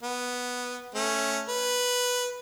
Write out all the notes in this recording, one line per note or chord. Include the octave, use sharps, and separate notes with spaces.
B3
A3 C#4
B4